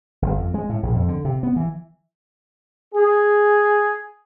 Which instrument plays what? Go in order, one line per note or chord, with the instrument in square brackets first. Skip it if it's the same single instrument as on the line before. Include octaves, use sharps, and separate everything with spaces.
[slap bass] G1
F2
G#3
A2
A#1
F2
D3
C3
B3
E3
[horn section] G#4